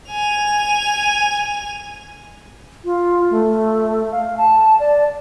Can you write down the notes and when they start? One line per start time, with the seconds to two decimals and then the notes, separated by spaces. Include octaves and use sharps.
0.11 G#5 F7
2.85 F4
3.30 A3
4.12 F5
4.37 A5
4.80 D5